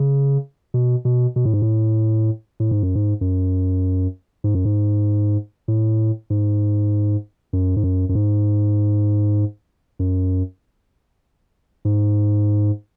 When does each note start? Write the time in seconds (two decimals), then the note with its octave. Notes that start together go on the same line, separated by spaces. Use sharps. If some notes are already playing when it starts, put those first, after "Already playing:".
Already playing: C#3
0.74 B2
1.05 B2
1.36 B2
1.45 A2
1.54 G#2
1.62 A2
2.60 A2
2.71 G#2
2.83 F#2
2.95 G#2
3.21 F#2
4.44 G#2
4.55 F#2
4.65 G#2
5.68 A2
6.30 G#2
7.53 F#2
7.76 G#2
7.83 F#2
8.09 F#2
8.15 G#2
9.99 F#2
11.85 G#2